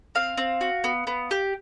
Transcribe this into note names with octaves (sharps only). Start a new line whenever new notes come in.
C4 F5
C4
F#4
B3
B3
G4